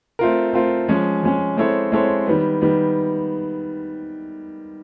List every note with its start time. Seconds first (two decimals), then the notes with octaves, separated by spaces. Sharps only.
0.19 A3 C4 F4 A#4
0.53 A3 C4 F4 A#4
0.88 F3 G#3 C#4
1.23 F3 G#3 C#4
1.57 G#3 C4 E4 A4 C#5
1.92 G#3 C4 E4 A4 C#5
2.26 D#3 G3 B3
2.61 D#3 G3 B3